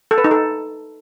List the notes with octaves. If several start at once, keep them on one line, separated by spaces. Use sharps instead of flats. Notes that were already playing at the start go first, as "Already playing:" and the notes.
A4
B4
D#4
A4